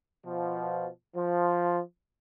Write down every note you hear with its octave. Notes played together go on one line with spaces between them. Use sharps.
B2 F3
F3